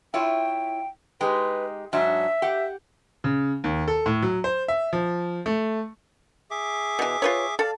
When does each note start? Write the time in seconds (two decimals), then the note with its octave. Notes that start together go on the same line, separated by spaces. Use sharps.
0.14 E4 F4 C#5 G5
1.21 G#3 D#4 G4 B4
1.93 G#2 F#3 D4 E5
2.42 G4 F#5
3.24 C#3
3.64 D#2
3.88 A4
4.06 A2
4.22 F#3
4.44 C5
4.68 E5
4.93 F3
5.46 A3
6.51 G#4 E5 D6
6.99 B2 E3
7.22 F4 B4 C#5
7.59 A4 D5 F5